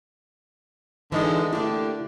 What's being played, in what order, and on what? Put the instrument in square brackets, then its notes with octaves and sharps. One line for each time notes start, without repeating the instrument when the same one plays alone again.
[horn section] D3 G#3 [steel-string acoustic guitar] E3 D#4 E4
[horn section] D3 A3 G4 [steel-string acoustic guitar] A#3 D4 [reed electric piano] E4